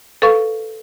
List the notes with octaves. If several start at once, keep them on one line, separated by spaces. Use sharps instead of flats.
A4 B4 F5 C#6